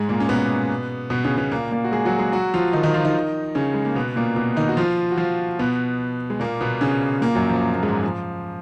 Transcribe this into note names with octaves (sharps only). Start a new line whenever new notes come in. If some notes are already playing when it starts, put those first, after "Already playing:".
Already playing: G#2 G#3
A#2 A#3
C#4
B2 B3
B2 B3
C#3 C#4
B2 B3
A#2 A#3
A#2 A#3
F#4
G#3 G#4
F#3 F#4
G#3 G#4
F#3 F#4
F3 F4
D#3 D#4
D#3 D#4
F3 F4
D#3 D#4
C#3 C#4
G#3
A#3
B2 B3
A#2 A#3
B2 B3
D#3 D#4
F#4
F3 F4
F#4
F3 F4
B2 B3
G#3
A#2 A#3
B2 B3
C#3 C#4
A#2 A#3
F#2 F#3
F3
A#3
G#2 G#3
F3